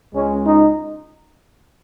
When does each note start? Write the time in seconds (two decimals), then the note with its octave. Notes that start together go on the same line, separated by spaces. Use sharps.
0.14 C#2 C#3 G#3 C#4
0.46 D#4